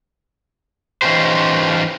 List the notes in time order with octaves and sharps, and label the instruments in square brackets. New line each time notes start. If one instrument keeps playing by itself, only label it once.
[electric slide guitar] E3 C#4 D#4 F4 G4 C5